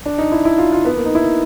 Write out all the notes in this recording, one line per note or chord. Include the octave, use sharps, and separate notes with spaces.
D4
D#4
E4
E4
F4
F4
B3
A#3
D#4
E4